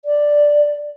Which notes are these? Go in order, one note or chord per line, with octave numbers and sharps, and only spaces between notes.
D5